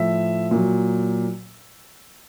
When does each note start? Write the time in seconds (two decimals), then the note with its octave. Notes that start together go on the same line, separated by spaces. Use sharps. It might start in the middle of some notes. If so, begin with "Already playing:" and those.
Already playing: A2 F3 E5
0.51 A#2 F#3